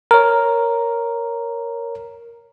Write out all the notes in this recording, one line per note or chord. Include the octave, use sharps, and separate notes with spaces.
A#4 C#5